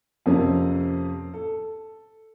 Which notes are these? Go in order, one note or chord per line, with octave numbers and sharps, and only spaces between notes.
F2 C3 A#3 C#4
A4